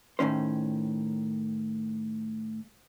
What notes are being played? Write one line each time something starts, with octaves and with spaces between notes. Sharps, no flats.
A2 D#3 C#4 C5